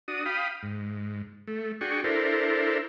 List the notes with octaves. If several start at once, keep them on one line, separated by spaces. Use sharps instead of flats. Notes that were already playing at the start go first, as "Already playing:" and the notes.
D4 F#4 D#6
F5 G5 B5 D#6
G#2
A3
D4 F#4 G#4 G5 C#6
D4 E4 A4 A#4 C5